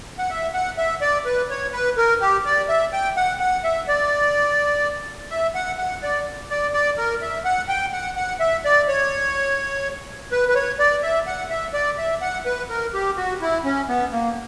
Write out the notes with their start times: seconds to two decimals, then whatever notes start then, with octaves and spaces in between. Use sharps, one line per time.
0.18 F#5
0.30 E5
0.54 F#5
0.78 E5
1.01 D5
1.25 B4
1.50 C#5
1.73 B4
1.97 A#4
2.21 G4
2.46 D5
2.69 E5
2.93 G5
3.17 F#5
3.40 F#5
3.64 E5
3.88 D5
5.30 E5
5.55 F#5
5.78 F#5
6.03 D5
6.50 D5
6.73 D5
6.98 A#4
7.22 E5
7.45 F#5
7.69 G5
7.93 F#5
8.17 F#5
8.40 E5
8.65 D5
8.88 C#5
10.32 B4
10.48 B4
10.55 C#5
10.79 D5
11.03 E5
11.27 F#5
11.50 E5
11.74 D5
11.98 E5
12.22 F#5
12.46 B4
12.70 A#4
12.94 G4
13.17 F#4
13.42 E4
13.65 C#4
13.89 B3
14.12 A#3